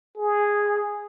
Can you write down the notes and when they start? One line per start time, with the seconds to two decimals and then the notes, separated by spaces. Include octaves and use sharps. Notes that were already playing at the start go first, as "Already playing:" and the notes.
0.17 G#4